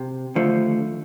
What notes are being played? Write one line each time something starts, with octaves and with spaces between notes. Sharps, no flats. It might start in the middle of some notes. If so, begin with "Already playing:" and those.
Already playing: C3
D#2 D3 F3 A3